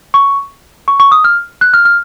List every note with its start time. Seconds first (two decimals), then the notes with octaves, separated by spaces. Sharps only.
0.14 C#6
0.88 C#6
1.00 C#6
1.12 D#6
1.24 F6
1.61 F#6
1.74 F6
1.85 F6